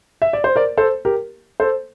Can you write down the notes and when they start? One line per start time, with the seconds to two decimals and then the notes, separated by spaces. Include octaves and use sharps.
0.22 E5
0.33 D5
0.44 C5
0.56 A#4 D5
0.77 A4 C5
1.05 G4 A#4
1.60 A4 C5